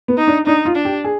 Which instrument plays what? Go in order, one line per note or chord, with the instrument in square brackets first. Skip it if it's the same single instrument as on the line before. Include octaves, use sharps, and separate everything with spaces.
[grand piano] B3
[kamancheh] D#4
[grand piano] D4
[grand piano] D4 [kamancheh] D#4
[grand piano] F4
[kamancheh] D4
[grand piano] G4
G#4